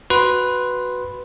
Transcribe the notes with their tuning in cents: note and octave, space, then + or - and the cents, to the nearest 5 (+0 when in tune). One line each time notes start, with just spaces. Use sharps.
F#4 +0 B4 +0 C6 +0